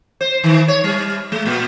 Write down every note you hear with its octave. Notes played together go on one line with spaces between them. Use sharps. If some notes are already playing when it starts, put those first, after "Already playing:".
C5
D#3
C#5
G3
G#3
A#2